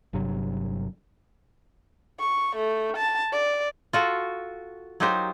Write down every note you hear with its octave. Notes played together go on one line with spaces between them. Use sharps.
G1 G2 C3 F#3
C#6
A3
A5
D5
F4 F#4 A4
F#3 D#4 F4 G4 A#4 C5